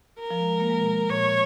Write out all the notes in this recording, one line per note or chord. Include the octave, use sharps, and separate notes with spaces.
A#4
F3
G#3
G#3
A#3
G#3
B2
A#2 C#5